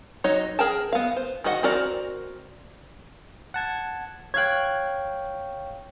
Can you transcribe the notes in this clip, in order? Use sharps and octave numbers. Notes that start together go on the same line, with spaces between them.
F#3 D#4 C#5 D#5
G#4 A#4 G5 A5
B3 F5
C5
D#3 F#4 D#5 F#5
C4 F#4 A#4 D5
F#5 A5 G#6
C#5 F5 G5 F#6 G#6